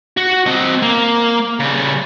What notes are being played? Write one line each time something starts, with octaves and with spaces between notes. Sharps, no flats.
F#4
C4 D#5
A#3
C#3 G3